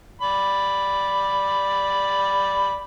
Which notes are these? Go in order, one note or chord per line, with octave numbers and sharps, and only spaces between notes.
D5 B5